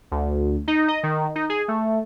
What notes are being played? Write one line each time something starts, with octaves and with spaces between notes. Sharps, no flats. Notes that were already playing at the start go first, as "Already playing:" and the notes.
D2
D#4
D#5
D#3
D#4
G#4
A3